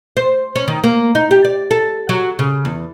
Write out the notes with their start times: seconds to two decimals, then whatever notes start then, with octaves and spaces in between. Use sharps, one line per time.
0.17 C5
0.56 C#4
0.68 D#3
0.84 A#3
1.15 D#4
1.31 G4
1.45 D5
1.71 A4
2.09 F#3
2.39 C#3
2.65 E2